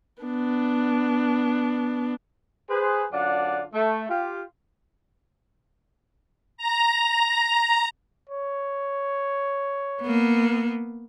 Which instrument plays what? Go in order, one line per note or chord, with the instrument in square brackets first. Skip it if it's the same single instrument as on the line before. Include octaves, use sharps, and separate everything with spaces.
[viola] B3 D4
[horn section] G#4 B4 C5
F#2 D3 D4 F4 D5 F#5
A3
F4 G4
[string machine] A#5
[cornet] C#5
[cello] A#3 B3